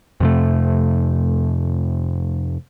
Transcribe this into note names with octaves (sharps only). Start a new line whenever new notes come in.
F2 C3 A3